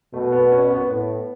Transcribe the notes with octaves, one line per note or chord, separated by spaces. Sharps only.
B2 A3
B3
C#4
B3
A2 B3